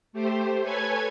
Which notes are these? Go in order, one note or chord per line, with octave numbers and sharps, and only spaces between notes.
A3 G4 C5
A4 B4 C#5 G#5 G#6